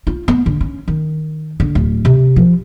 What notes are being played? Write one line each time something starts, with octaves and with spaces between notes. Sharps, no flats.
F4
B3
D3
C#4
D#3
D3
D1
C3
F3